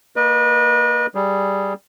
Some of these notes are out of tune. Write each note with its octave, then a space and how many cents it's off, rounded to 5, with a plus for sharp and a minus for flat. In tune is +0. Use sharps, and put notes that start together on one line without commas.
A#3 -5 B4 -35 D#5 -30
G3 +0 G#4 +0